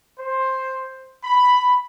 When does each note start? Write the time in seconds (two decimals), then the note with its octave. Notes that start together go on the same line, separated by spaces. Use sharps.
0.18 C5
1.23 B5